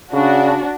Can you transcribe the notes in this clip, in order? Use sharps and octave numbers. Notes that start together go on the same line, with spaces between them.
C#3 D4 F#4